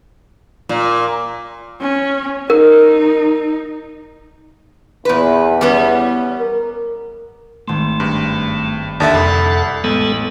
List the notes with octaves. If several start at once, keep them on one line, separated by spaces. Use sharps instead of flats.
A#2
C#4
D#4 A#4
E2 A#2 B4
G3 B3 C#4
A#4
G#1 A3 C6
G2
D#2 D3 D5 E5 A5 D#6 A6
C2 F2 A4 F#5 B5
A1 G#3 B3 A4